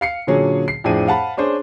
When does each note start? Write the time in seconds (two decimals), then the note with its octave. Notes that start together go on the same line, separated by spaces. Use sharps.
0.01 F5 C7 C#7
0.27 A#2 D3 F#3 C#4 G#4
0.68 C7
0.84 F2 A2 D4 G#4 D#7
1.07 F5 F#5 A5 B5
1.37 C#4 D4 G#4 C5